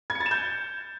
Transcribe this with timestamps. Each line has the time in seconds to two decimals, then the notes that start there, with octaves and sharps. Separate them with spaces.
0.10 G#6
0.15 C#7
0.20 A6
0.26 E7
0.31 G6